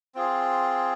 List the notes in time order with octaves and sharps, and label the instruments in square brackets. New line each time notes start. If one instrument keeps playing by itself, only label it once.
[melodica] C4 F4 G#4